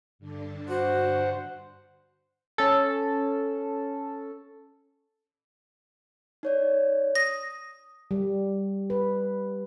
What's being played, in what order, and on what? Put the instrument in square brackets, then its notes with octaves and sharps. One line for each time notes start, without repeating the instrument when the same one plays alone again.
[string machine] G2 D3 D4
[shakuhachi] F#4 [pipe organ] C5 F#5
[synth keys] C#4 A4
[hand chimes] D#4 C#5 D5
[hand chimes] D#6 [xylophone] A#6
[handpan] G3
B4